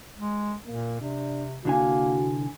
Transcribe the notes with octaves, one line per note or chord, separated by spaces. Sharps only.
G#3
A#2 A#3
C3 D4
C2 D3 A#3 F#4 G#5